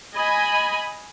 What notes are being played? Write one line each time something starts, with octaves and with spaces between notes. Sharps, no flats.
D#5 G#5 B5